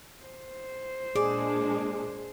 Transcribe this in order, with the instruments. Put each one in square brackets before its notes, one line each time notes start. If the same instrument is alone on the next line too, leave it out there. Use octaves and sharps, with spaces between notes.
[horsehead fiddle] C5
[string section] A#2 G#3 D4 [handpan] G#4 [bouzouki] D5